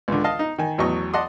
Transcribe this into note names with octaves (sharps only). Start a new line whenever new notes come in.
C#2 D3
D#5 F5 A5
D#4
D#3 G#5
A1 E2 F#3 D#5 C#6
D5 D#5 F#5 A5 C6 D#6